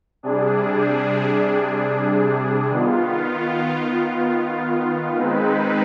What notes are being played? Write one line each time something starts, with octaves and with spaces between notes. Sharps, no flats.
C3 G3 D4 G#4
D#3 B3 F4
D#3 G#3 C4 D#4 B4